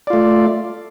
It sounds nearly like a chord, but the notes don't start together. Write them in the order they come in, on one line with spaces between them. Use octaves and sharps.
D5 F4 A3